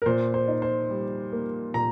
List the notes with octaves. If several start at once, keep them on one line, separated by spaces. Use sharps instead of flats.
A#4
A#2 C5
C5
D#4
C5
G3
A#3
A#2 A#5